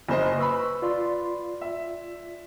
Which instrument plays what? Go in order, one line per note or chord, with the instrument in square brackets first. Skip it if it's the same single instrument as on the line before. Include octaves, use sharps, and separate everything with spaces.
[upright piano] F#1 C5 D#5 [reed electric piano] G#5
[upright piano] B4 B5 [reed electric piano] C#6 E6
[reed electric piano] F4 D5 C6
[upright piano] E5